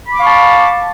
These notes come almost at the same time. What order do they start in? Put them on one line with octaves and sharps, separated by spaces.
B5 D6 F5 C#6 A5